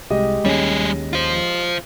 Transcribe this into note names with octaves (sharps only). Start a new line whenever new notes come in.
C2 G#3 G4 D#5
D#2 G3 C#4 G#4
F4 C5